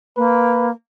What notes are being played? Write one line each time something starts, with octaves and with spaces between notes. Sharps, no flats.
A#3 B4